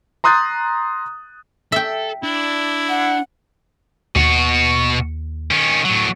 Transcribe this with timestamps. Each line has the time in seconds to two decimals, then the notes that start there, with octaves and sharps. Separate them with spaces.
0.24 A#5 C6 D#6 F#6 G6 A6
1.72 A4 E5 G5
2.23 D4 E4
2.89 F#5
4.16 D#2 B2 F#4
5.51 D#3 C#4
5.85 A2 F#3